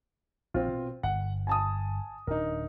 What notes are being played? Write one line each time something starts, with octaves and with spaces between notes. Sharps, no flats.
A#1 C4 F4
B2
G1 F#5
G#5 A5 D#6
D1 D4 D#4 A#4